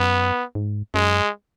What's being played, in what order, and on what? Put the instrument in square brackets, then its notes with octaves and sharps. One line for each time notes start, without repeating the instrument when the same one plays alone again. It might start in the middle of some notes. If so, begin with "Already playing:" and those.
Already playing: [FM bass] F#2 [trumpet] B3
[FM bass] G#2
[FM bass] F#2 [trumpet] G#3